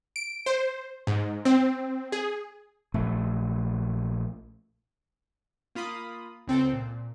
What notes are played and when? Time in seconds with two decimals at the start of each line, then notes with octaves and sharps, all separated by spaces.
0.16 D7
0.46 C5
1.07 G#2
1.45 C4
2.12 G#4
2.94 A#1 A3
5.75 A#3 F4 B5 D#6
6.47 C#2 C4 A4 G6
6.73 A#2